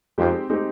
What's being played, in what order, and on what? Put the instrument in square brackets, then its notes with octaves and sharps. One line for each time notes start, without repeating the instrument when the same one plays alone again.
[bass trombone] F2 [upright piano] G#3 C4 D#4 G4
[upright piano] G#3 C4 D#4 G4